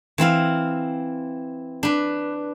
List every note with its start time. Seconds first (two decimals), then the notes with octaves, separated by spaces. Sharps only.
0.18 E3 C4 E4 F5
1.83 D4 B4